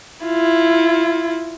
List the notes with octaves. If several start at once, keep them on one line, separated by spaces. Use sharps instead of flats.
E4 F4